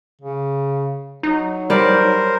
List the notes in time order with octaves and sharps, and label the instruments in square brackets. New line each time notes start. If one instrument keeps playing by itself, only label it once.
[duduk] C#3
[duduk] F#3 [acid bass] D#4
[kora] G3 D5 [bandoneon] A#4 C5